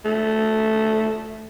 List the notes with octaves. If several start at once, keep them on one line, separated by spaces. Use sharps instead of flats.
A3